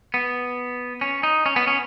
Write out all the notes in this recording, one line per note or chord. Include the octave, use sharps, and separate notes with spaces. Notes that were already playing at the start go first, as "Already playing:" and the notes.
B3
C#4
D#4
C#4
B3
C#4